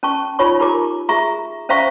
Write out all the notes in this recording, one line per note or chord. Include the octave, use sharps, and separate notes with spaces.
C#4 A5 C#6
D#4 F4 C#5 B5 C#6
D#4 G4 A#4 A#5 D6
G#4 E5 A#5 C#6
C#4 C5 E5 F5 A#5 C#6